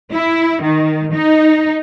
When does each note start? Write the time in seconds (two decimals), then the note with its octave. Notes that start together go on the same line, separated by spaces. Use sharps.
0.13 E4
0.63 D#3
1.14 D#4